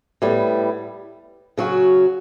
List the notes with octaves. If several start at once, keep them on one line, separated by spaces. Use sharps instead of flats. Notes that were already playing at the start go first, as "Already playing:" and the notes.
A2 G3 B3
C#3 F#3 C#4 F#4